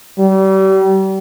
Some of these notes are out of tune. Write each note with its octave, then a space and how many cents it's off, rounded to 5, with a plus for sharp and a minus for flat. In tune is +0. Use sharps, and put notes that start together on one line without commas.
G3 -35